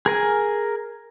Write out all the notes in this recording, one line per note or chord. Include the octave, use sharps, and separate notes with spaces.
G#4 A#4 G#5